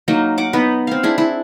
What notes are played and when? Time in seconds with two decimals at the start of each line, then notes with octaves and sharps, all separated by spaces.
0.08 F#3 A#3 D#4
0.38 F#5 D6
0.53 B3 D#4 B4
0.87 C4 F5
1.03 D4 E4 G#4
1.18 E4